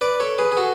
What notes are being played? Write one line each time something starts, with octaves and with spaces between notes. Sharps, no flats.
B4 D5
A4 C#5
G#4 B4
G#4
F#4 A4